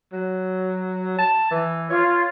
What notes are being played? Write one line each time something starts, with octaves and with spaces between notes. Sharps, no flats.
F#3
A5
E3
F4 C#5